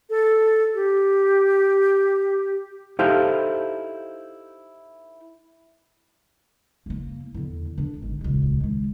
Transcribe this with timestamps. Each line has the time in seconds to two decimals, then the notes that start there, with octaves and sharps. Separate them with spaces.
0.10 A4
0.74 G4
2.99 D#4 E4 G4 A4 C5 F5
6.86 F#1 A#3
7.34 E2 D3
7.78 D3 D4
8.02 G#1
8.21 D#1 C#2
8.60 D#3 G#3